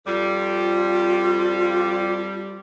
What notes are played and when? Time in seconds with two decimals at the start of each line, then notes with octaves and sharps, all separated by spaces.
0.07 F2 G3 F4